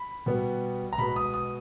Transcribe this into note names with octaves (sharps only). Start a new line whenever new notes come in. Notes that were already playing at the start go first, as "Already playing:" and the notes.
Already playing: B5
B2 G3 B3
A#5
B2 G#3 B3 B5
D#6
D#6